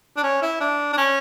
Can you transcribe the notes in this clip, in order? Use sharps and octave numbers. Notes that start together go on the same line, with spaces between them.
D4
C#4
E4
D4
D4
C#4